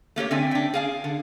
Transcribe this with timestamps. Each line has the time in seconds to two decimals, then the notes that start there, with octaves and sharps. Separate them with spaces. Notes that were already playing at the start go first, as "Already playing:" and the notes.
0.16 A3 A#3 G4 C#5
0.31 D3 C4 D5 E5 G#5
0.51 D4 G5
0.74 G#4 F5 G#5
1.04 D3